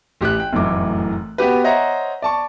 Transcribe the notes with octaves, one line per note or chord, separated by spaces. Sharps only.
A1 G4 G5 F#6
G5
F1 F#2 A2 E3 D6
B3 F#4 G4 B4
C5 C#5 D#5 E5 F#5 A#5
D5 A5 C#6